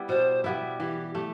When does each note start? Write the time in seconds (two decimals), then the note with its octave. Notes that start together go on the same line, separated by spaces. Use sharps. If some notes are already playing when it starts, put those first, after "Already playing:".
Already playing: G3 B3 E4
0.09 B2 C5
0.44 G3 B3 E4 E5
0.80 E3 G4
1.15 A3 G4